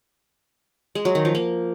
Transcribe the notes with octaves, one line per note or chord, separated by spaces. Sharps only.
G#3
F#3
D#3
F3
A#3